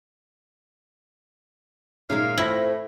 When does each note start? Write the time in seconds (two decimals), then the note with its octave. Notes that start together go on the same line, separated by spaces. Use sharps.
2.10 A#2 D#3 G#3 A#3 C#4 A#4 E5 F5
2.38 A2 C4 E4 F4 A#6 F#7